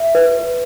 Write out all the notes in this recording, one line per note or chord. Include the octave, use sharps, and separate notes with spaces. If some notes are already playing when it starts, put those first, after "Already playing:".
Already playing: E5
B4